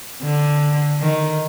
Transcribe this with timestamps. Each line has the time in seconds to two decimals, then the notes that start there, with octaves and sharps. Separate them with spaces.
0.22 D3
1.00 D#3